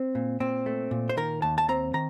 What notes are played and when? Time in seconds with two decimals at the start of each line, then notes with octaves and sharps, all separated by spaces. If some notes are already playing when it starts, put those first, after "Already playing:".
Already playing: C4
0.15 A#2
0.40 A#2 C4
0.66 A3
0.91 A#2
1.09 C5
1.17 D#3 A#4
1.42 D#2 A5
1.58 A5
1.68 C4 A#5
1.94 D#3 A#5